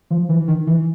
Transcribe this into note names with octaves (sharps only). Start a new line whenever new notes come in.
F3
E3
D#3
E3